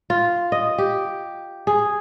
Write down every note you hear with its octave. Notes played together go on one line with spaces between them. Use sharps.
F4
D#5
G4
G#4